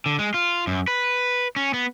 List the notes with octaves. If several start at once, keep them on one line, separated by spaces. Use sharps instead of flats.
D3
G#3
F4
F#2
B4
C#4
B3